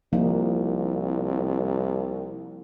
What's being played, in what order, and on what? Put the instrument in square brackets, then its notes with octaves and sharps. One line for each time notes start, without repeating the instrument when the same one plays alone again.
[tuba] C2 [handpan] F3 A#3 D#4